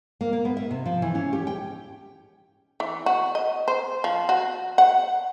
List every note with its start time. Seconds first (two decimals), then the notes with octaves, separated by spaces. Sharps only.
0.21 A#3
0.33 A#3
0.45 B3
0.57 E5
0.71 C3
0.86 F3
1.02 E3
1.15 C#4
1.33 G4
1.47 G5
2.80 E3
3.06 F#4
3.35 D#5
3.68 C5
4.04 F3
4.29 F#4
4.78 F#5